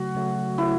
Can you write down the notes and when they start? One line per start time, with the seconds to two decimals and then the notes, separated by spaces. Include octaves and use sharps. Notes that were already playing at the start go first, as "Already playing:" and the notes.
Already playing: C#3 F#3 A3 F#4
0.15 C#3 F#3 A3
0.57 C#3 F#3 A3 E4